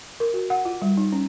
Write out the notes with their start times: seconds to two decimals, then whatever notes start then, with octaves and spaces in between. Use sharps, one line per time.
0.20 A#4
0.34 F#4
0.50 F#5
0.65 F4
0.82 G3
0.97 D#4
1.12 C#4